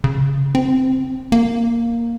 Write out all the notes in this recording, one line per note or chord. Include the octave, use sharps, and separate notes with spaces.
C#3
C4
A#3